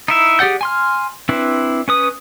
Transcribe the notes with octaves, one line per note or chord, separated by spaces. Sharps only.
D#4 E4 E5
G4 G#4 D5 F#5 G6
G#5 C6 F6
C4 D4 E4 B4
C#4 B4 D#6